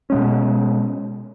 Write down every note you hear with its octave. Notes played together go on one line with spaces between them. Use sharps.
B2 G#3 C#4